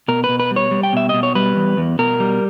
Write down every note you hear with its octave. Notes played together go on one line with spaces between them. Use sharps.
B2 A#4
B4
B2
B4
G3
C#5
G3
G5
B2 E5
B2 D#5
C#5
G3 B4
E2
E2
B2 A#4
G3